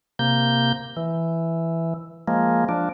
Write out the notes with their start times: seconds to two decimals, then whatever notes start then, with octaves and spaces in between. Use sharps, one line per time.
0.19 C3 A#3 G6
0.97 E3
2.28 F3 G#3 A#3
2.69 F3 D4